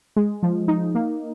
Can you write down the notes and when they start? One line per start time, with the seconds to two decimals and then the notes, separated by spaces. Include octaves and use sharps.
0.16 G#3
0.43 F3
0.68 D#4
0.95 A#3